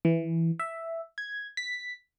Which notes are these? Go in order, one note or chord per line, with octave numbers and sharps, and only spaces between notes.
E3
E5
G#6
B6